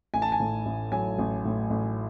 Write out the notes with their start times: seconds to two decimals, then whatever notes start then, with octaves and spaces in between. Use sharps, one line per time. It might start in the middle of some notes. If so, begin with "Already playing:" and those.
0.14 A1 G#5
0.22 A5
0.32 G#5
0.40 A2
0.66 A1
0.92 F#3 G#5
1.18 A1
1.45 A2
1.70 A1